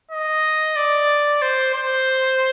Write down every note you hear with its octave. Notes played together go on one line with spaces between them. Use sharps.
D#5
D5
C5
C5